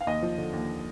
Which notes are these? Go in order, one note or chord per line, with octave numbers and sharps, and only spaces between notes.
F5
D#2 D#5
F3
D3
D#2